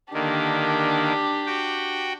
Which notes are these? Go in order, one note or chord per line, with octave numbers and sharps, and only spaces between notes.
D3 D#3 A#3 D4 G4
F#4 G5